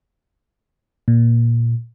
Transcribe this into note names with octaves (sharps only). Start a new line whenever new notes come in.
A#2